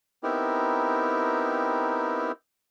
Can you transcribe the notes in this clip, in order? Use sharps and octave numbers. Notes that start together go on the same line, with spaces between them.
B3 C4 D#4 E4 G4 A#4